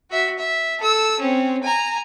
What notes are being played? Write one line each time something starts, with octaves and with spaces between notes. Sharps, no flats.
F#4 E5
E5
A4 E6
C4 C#4
G#5 A#5